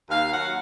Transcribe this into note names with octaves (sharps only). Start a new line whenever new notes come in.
D#2 F5
F#3 F#5